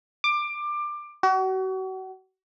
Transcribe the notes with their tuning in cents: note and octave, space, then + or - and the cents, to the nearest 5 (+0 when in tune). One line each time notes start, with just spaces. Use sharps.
D6 +20
F#4 +35